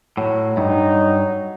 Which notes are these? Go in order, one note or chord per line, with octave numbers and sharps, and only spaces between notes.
A2 F#3
G2 D#4